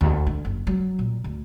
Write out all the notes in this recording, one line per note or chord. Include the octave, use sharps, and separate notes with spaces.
D2
D3
F#1
F#3
A#2
D2